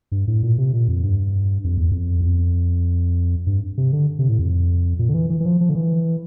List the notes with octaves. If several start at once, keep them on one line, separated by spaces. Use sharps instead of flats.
G2
A2
A#2
C3
A#2
F2
G2
F2
E2
F2
E2
F2
G2
C3
D3
C3
A2
F2
A#2
D3
E3
E3
E3
F3
F3
D3
E3